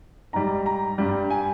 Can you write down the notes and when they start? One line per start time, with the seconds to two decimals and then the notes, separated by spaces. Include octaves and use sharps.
0.33 G#2 G3 A#5
0.66 A#5
0.98 G2 G3
1.30 G#5